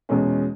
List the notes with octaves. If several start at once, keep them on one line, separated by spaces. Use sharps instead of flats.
E2 B2 G#3 C#4